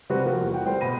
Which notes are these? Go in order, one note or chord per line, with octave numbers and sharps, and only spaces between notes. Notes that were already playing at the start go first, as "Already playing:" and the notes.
C3 G3 C4 F#4 B4
F3 A#3 F#4
E2
F#5 G5
G3 C4 A4 B4 C5 G5
B2 B5 A#6 D#7